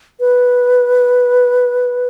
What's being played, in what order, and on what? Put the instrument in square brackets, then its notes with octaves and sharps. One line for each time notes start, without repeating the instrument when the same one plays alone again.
[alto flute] B4